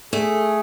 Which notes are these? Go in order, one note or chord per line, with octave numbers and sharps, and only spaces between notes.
A3 G#4